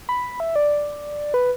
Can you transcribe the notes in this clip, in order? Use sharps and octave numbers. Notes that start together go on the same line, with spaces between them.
B5
E5
D5
B4